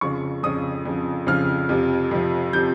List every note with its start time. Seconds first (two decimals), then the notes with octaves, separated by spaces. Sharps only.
0.01 F2 C#3 F3 C#6
0.43 F2 C#3 F3 D#6
0.85 F2 C#3 F3
1.27 F2 C#3 F3 F6
1.69 F2 C3 F3
2.11 F2 C3 F3
2.53 C3 F3 G6